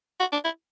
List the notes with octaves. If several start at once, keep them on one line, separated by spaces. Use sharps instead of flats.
F#4
D4
E4